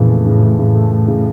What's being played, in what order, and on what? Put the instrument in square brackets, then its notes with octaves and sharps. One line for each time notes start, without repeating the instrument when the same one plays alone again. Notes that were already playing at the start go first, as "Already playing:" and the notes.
Already playing: [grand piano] F2 C#3 E3 [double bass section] A#2
[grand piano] A3
[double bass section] A2 [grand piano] C#3
[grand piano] E3
[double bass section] A2 [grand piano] C#3
[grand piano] A3
A3
C#3